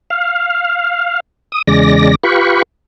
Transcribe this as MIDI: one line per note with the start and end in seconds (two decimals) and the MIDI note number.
0.10 1.20 77
1.52 1.62 87
1.67 2.15 40
1.67 2.15 49
1.67 2.15 56
1.67 2.15 74
1.67 2.15 94
2.23 2.62 65
2.23 2.62 67
2.23 2.62 71
2.23 2.62 83
2.23 2.62 85